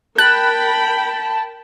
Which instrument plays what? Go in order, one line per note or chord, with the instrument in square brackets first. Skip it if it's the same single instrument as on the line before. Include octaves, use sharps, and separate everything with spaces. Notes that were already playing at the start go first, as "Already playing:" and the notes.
[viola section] A#4 G5 B5 [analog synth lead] A5 [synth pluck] F#6